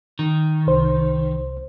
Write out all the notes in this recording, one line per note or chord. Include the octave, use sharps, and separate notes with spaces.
D#3
C2 C5